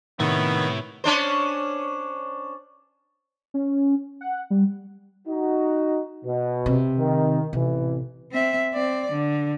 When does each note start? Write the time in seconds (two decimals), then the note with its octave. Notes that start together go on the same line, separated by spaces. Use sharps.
0.20 A2 C3 D#3 B3 E4 C#5
1.04 C#4 D4 C5
3.54 C#4
4.21 F#5
4.50 G3
5.27 D#4 F#4
6.25 B2
6.66 C3
6.97 D#3
7.53 A1 C3 E3
8.32 C4 E5
8.74 C4 D5
9.12 D3